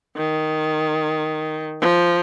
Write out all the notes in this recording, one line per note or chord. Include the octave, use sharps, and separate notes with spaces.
D#3
F3